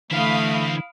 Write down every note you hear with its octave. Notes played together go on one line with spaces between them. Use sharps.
D3 E3 A3 C4 E4 F5 B5 D#6